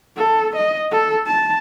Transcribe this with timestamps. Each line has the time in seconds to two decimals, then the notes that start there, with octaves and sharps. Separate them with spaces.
0.17 A4
0.56 D#5
0.91 A4
1.26 A5